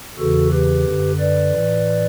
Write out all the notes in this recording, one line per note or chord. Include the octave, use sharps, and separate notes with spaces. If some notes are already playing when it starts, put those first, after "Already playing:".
E2 C#3 E3 F#4 A4
G4 B4
F#2 D3
B4 D5
A2 E3